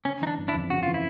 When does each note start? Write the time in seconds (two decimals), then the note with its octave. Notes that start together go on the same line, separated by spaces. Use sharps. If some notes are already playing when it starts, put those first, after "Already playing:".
0.05 C#3 C#4
0.21 E3 D#4
0.27 D4
0.38 G1
0.48 D4 E4
0.54 F2
0.70 C#3 F#4
0.83 E3 F4
0.94 E4